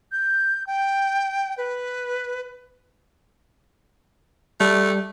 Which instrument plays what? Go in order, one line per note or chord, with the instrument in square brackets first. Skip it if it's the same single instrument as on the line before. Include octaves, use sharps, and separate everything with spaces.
[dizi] G6
G5
B4
[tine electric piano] G3 [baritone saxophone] A3